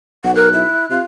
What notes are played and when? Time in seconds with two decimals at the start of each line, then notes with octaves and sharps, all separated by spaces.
0.24 B1 F#5
0.35 A#4 F#6
0.52 E4
0.90 C3 F4